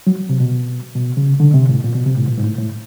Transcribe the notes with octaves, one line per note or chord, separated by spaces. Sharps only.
F#3
C3
B2
B2
C#3
D3
C3
A2
A#2
B2
C3
A2
A#2
G#2
A2
A2